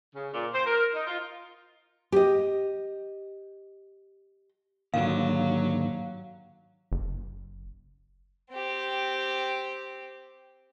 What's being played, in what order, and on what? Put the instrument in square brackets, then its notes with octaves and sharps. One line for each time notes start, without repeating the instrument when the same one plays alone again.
[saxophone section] C#3
A#2
C5
A#4
D#4
F4
[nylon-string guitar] G4 D#5
[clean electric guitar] D#2 D3 [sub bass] G#2 [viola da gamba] F#3 [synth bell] F5
[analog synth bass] F#1
[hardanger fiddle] C4 G4